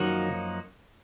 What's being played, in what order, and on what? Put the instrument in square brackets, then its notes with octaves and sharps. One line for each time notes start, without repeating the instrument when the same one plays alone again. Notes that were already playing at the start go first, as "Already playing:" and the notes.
Already playing: [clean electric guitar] F#2 F3 A#3 D#4 F#4 [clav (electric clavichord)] D#3 F#3